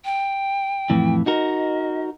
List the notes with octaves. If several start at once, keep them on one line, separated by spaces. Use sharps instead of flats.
G5
F2 A2 E3
D#4 F#4 A#4 D#5